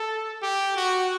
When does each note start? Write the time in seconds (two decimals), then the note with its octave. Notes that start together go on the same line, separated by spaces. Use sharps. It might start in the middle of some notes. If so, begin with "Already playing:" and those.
Already playing: A4
0.42 G4
0.76 F#4